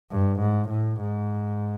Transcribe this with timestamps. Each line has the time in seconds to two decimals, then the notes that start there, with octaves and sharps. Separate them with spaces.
0.11 G2
0.40 G#2
0.70 A2
1.01 G#2